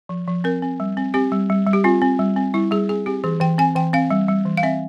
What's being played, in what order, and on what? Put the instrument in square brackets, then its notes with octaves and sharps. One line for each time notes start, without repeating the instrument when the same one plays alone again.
[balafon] F3
F3
C4 A#4
C4
G3
C4
C4 G4
G3
G3
G3
G4
C4 F4
C4
G3
C4
G3 E4
G3 G#4
C4 G#4
C4 G4
E3 G#4
E3 G5
C4 G#5
E3 G5
C4 F5
G3
G3
E3
F5
C4 E5